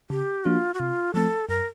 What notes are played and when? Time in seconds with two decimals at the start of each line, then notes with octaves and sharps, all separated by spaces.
0.10 C#3 G4
0.45 F3 A#3 D4 F4 F#4
0.74 F#4
0.79 C3 F4
1.14 F3 A3 C4 A4
1.48 F#2 A#4